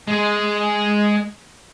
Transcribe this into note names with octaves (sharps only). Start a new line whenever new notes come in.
G#3 G#4